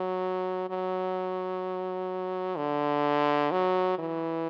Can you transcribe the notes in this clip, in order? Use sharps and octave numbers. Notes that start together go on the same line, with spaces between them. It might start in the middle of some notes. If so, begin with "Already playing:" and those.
Already playing: F#3
F#3
D3
F#3
E3